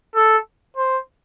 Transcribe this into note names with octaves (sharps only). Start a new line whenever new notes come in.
A4
C5